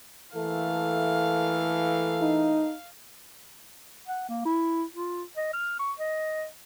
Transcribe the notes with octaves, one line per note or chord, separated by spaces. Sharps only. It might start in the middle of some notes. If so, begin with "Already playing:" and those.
E3 A3 A#3 A4 F5
D#4
F#5
A#3
E4
F4
D#5
F6
C#6
D#5